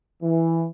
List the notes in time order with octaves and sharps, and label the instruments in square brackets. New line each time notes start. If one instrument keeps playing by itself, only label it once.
[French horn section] E3